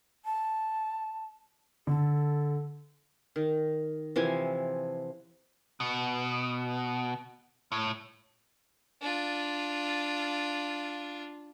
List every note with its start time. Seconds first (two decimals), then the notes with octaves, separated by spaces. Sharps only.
0.25 A5
1.87 D3 A4
3.36 D#3
4.16 C3 E3 F3 G#5
5.80 B2
7.72 A2
9.02 D4 F4